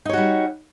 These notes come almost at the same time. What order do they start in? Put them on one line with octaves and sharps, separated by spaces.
D#4 C#5 F#4 G3